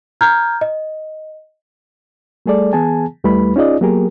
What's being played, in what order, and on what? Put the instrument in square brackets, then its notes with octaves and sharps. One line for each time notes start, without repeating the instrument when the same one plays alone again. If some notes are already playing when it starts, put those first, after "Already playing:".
[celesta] A#5 F6 G6 G#6
D#5
[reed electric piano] G3 A3 G#4 A4 D5
E3 B3 G#4 G#5 A5
D#2 G3 A3 E4 B4 B5
C#4 D#4 F4 G#4 D5 D#5
F#3 A#3 B3 G4 G#4 A#4